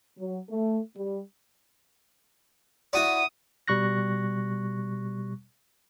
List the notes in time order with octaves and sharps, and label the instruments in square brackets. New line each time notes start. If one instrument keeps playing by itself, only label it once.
[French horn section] F#3
A3
G3
[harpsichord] E4 F#4 D5 [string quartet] D#6
[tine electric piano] B2 G3 C#6 F#6 A#6